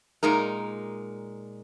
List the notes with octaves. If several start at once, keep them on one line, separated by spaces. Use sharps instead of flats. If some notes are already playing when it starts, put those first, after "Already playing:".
A#2 G#3 D#4 A#4